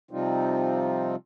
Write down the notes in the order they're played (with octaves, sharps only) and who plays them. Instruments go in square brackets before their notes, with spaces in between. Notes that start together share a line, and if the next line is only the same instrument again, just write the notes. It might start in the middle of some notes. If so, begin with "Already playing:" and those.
[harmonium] C3 F3 G3 C4 D#4 F4